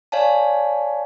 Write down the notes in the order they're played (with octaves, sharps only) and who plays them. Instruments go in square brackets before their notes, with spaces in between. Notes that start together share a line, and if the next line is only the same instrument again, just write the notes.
[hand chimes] C#5 D5 F5 G#5 A5